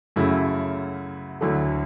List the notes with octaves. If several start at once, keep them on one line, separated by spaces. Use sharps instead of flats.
F#2 C#3 F#3 A3 E4
D2 D3 F#3 A3 E4